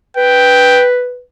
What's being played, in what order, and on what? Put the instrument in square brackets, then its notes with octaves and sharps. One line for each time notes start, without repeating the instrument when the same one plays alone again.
[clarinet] B4 [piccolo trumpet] G5